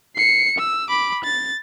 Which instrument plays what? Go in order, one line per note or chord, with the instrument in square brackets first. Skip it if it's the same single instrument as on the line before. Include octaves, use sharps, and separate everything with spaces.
[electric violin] C7 C#7
E6
B5 D6
A6